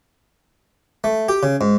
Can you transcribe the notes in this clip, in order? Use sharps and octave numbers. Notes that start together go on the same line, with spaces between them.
A3
G4
C#3
G#2